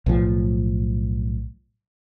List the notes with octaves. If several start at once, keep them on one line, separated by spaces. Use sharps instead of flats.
B1 A2 F3